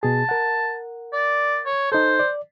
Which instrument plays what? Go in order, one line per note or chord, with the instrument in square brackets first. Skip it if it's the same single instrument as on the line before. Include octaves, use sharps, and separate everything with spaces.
[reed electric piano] B2 G#4 [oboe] A5
[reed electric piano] A#4 F#5
[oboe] D5
C#5
[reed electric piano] D#4 A4 [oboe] C5
[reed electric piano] D5